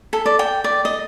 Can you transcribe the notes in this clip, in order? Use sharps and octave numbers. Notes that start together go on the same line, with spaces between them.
A4
D5
G5
D5
D#5